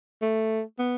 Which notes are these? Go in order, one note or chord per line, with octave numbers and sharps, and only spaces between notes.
A3
B3